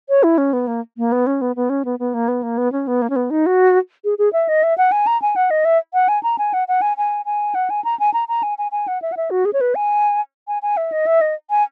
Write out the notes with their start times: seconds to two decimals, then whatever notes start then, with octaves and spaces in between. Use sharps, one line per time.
0.09 C#5
0.23 E4
0.38 C#4
0.53 B3
0.67 A#3
0.97 A#3
1.12 B3
1.27 C#4
1.41 B3
1.56 B3
1.70 C#4
1.85 B3
1.99 B3
2.14 A#3
2.28 B3
2.43 A#3
2.58 B3
2.72 C#4
2.87 B3
3.02 A#3
3.10 C#4
3.16 B3
3.30 D#4
3.46 F#4
4.05 G#4
4.19 G#4
4.33 E5
4.48 D#5
4.63 E5
4.78 F#5
4.92 G#5
5.07 A#5
5.22 G#5
5.36 F#5
5.51 D#5
5.65 E5
5.94 F#5
6.08 G#5
6.23 A#5
6.38 G#5
6.54 F#5
6.68 F#5
6.82 G#5
6.97 G#5
7.26 G#5
7.55 F#5
7.70 G#5
7.85 A#5
8.00 G#5
8.14 A#5
8.28 A#5
8.43 G#5
8.58 G#5
8.72 G#5
8.88 F#5
9.02 E5
9.12 F#5
9.17 E5
9.31 F#4
9.45 G#4
9.53 C#5
9.61 B4
9.75 G#5
10.48 G#5
10.63 G#5
10.77 E5
10.92 D#5
11.06 E5
11.21 D#5
11.50 G#5